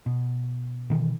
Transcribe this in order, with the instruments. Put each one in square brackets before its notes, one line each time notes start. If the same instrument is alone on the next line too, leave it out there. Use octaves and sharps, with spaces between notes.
[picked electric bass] B2
B2 D#3 E3